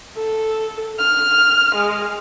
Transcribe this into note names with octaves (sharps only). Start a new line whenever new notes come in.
A4
F6
G#3